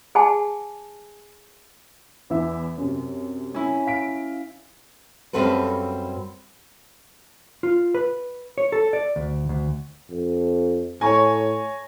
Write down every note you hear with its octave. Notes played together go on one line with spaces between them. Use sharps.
G#4 F#5 G#5 A5
E2 E4 E5
F#2 C3
C#4 E4
F5 B6 D7
F#2 G3 C4 F4 A4 B4
F4
B4
C#5
A4
D5
D2
D2
F2
A2 C#5 G#5 A#5 C#6